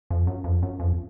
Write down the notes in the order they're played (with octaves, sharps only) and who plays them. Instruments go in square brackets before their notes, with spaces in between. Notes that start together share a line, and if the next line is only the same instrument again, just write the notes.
[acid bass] F2
F#2
F2
F#2
F2